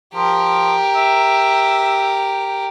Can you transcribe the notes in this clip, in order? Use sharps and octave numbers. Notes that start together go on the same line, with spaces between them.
F3 G4 A#4
E5